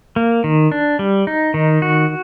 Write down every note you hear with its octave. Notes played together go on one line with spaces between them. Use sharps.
A#3
D#3
D4
G3
D#4
D#3
F#4